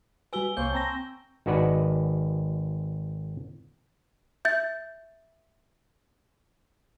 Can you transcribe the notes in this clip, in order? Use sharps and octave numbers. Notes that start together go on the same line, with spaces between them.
G3 F#4 B4 G#5 E6 G7
C2 A#3 C5 C#5 C#6 G6
C4 A5 A#5 A#6
G#1 D#4 F#4 B4 D5 F#5
E5 G6 A6